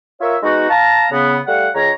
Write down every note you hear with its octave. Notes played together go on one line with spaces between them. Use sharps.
F4 A#4 C#5 E5
G#3 B3 D#4 F#4
F5 A5 A#5
C#3 B3
G3 A3 F5 F#5
C#2 C#5 A#5